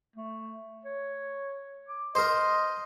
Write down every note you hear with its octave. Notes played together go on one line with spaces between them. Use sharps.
A3
C#5
D6
A#4 C5 D#5